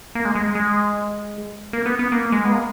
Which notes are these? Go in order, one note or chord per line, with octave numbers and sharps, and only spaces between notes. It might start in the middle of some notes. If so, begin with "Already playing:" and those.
A#3
G#3
G#3
G#3
A#3
B3
B3
A#3
G#3
B3
A#3